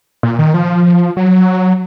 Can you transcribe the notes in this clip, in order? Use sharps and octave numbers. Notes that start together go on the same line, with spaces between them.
A#2
D#3
F3
F#3